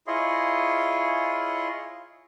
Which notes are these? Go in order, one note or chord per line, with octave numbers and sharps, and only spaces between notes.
E4 F4 G#4 C#5 D#5 C6